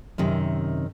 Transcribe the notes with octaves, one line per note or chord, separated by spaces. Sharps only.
F#2 C3 D#3